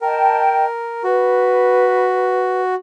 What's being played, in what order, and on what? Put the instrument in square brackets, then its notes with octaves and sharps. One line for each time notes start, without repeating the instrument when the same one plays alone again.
[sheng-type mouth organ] A#4 [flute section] D#5 G5 A5
[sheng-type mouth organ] F#4 [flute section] B4